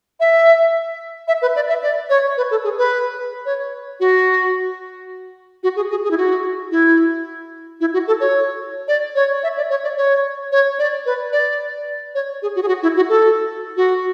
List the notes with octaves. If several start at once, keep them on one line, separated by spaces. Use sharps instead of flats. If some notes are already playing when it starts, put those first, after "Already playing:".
E5
E5
B4
D5
E5
D5
C#5
B4
A4
G#4
B4
C#5
F#4
F#4
G#4
G#4
G#4
E4
F#4
E4
E4
F#4
A4
C#5
D5
C#5
E5
D5
C#5
D5
C#5
C#5
D5
B4
D5
C#5
G#4
F#4
G#4
F#4
E4
F#4
A4
F#4